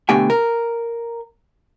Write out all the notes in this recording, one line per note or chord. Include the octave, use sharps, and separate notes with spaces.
B2 D3 A3 G4 G5 G#5
A#4